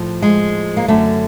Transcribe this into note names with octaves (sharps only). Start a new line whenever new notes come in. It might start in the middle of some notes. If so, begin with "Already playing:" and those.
Already playing: A2 F3
G#3
A#3
F#2 D3 F#3 A3